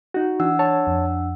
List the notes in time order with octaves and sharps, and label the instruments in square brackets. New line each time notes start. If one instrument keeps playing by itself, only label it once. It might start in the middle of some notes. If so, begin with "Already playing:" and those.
[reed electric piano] D#4 F#4
[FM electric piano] E3 [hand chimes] D4 F#5 E6
[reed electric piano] C#5 A5
[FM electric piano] F2